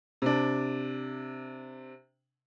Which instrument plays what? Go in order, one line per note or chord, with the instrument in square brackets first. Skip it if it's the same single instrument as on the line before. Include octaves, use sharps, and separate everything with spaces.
[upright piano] C3 D4